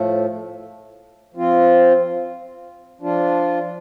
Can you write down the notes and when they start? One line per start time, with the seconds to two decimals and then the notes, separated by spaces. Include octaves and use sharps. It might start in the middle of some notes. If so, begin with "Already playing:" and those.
Already playing: A2 F3 A3
1.34 F3 C4 F4
3.01 F3 D4 F4